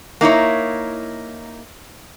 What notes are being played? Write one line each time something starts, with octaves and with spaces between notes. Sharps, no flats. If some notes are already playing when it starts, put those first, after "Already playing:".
A#3 D#4 E4 C#5